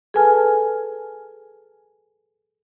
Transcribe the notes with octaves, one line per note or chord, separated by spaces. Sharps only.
G#4 A4 B4 G#5 A5 F6